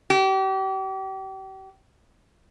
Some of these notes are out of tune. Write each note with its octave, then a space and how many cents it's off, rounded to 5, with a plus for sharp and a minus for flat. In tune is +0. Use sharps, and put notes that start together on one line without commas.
G4 -35